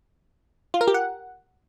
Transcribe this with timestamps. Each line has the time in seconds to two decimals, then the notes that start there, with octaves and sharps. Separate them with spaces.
0.74 F4
0.81 A#4
0.88 G4
0.94 F#5